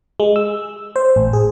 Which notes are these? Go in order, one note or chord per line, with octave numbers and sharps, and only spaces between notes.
G#3
E6
C5
A1
G#4